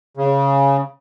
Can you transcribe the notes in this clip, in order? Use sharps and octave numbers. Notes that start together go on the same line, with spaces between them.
C#3